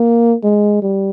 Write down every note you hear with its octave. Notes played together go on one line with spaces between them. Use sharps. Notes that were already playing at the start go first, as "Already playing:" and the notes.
Already playing: A#3
G#3
G3